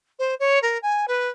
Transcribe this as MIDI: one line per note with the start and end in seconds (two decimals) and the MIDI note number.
0.19 0.34 72
0.39 0.59 73
0.62 0.78 70
0.82 1.05 80
1.08 1.28 71